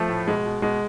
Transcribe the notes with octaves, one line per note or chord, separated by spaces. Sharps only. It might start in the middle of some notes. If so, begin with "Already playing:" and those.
Already playing: F3 A3
A2
B2 G#3
B2
B2 G#3